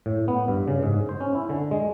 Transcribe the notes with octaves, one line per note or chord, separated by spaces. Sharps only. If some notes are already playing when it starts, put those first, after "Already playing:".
A2
B3
G2
C#3
G#2
C5
C#4
E4
D3
G#3